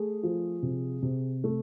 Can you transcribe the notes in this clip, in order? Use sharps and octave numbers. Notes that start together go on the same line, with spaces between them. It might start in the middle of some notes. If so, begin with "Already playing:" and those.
Already playing: A3 G#4
F3
C3
C3
A3